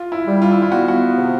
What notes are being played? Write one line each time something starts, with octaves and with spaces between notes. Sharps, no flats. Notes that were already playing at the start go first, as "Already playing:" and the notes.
Already playing: F4
E4
G3
F4
E4
F4
B3 F#4
F#4
C3